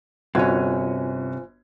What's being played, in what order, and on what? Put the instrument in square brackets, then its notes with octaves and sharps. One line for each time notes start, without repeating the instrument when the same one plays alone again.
[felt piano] G1 F#4 G#6 [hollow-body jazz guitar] C3 C#4 [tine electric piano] F4 C5 G#5